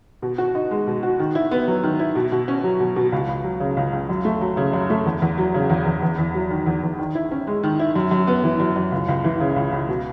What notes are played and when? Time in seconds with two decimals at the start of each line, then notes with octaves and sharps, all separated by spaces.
0.22 B2
0.38 F#4
0.55 D#4
0.71 G#3
0.87 B2
1.03 F#4
1.19 D#3
1.35 E4
1.51 B3
1.67 F#3
1.83 D#3
1.99 E4
2.15 B2
2.32 B2
2.48 C#4
2.64 F#3
2.80 B2
2.96 B2
3.12 C#2
3.28 C#2
3.44 F#3
3.60 C#3
3.77 C#2
3.93 C#2
4.09 F#2
4.25 A3
4.41 F#3
4.57 C#3
4.73 F#2
4.90 A3
5.06 E2
5.22 E2
5.38 F#3
5.54 C#3
5.70 E2
5.86 E2
6.02 E2
6.18 E2
6.34 F#3
6.50 D#3
6.66 E2
6.83 E2
6.99 D#3
7.15 E4
7.31 C#4
7.47 G#3
7.63 D#3
7.79 E4
7.95 F#2
8.11 F#2
8.27 B3
8.44 E3
8.60 F#2
8.76 F#2
8.92 C#2
9.08 C#2
9.24 E3
9.40 C#3
9.56 C#2
9.72 C#2
9.89 B2